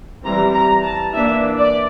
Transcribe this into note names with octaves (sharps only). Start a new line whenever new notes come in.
E3 G3 C4 A#5
A#5
A5
E3 A#3 D4 E5
D5